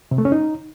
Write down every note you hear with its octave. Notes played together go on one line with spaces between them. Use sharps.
C3
A3
C#4
D#4